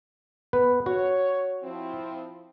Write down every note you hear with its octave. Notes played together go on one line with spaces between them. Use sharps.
B3 B4
F#4 C#5
F3 C4 E4